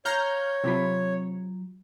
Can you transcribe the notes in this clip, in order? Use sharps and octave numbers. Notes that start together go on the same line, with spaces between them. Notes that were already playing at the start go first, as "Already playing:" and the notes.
C#5 F5 A#5 F6 G6
C3 F#3 F4 B5